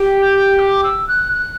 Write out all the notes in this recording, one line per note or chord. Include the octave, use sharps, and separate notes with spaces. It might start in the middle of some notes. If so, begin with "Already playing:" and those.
Already playing: G4
G6
D6
E6
F#6
F#6